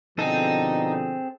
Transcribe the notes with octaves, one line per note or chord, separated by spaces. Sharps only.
B2 D3 F3 C4 D#4 G#4 A4